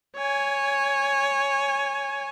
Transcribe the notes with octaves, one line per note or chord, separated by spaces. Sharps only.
C#5 G#5